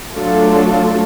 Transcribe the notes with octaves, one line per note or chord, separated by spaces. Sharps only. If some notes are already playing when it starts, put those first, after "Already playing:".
F#3 A3 D4 F4 A4